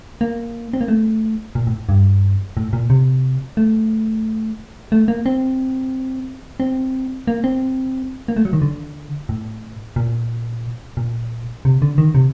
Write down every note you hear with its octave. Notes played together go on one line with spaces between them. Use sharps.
A#3
C4
A#3
A3
A#2
A2
G2
A2
A#2
C3
A3
A3
A#3
C4
C4
A#3
C4
A#3
A3
F#3
D#3
D3
A2
A#2
A#2
C3
D3
D#3
C3